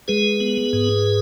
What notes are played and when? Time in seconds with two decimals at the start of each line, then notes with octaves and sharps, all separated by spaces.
0.08 G#3 G#4 B4
0.40 B3
0.73 G#2